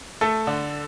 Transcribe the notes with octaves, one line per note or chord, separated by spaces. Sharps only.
A3 A4
D3